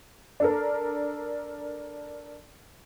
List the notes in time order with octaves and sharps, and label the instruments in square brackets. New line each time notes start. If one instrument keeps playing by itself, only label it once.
[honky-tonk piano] D4 A4 A#4